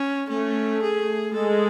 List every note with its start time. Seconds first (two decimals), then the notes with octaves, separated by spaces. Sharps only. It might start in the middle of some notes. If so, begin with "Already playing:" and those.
Already playing: C#4
0.29 A3 C#4
0.82 G#4
1.34 G#3 A4